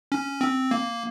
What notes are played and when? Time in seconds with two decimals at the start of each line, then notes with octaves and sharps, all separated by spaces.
0.12 C#4
0.41 C4
0.71 A#3